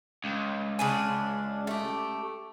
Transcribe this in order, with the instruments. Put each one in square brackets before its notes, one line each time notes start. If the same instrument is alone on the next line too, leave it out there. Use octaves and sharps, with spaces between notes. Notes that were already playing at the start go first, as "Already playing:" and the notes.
[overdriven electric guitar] C#2
[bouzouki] C#3 D4 G#5
A3 G4